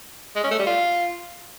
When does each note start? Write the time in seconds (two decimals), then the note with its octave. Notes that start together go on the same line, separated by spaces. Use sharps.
0.36 G#3
0.43 C#4
0.51 A3
0.59 G3
0.66 F4